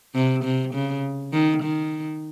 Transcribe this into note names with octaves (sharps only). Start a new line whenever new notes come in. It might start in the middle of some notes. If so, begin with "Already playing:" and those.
C3
C3
C#3
D#3
D#3